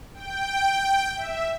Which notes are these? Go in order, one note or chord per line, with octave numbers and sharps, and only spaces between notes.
G5
E5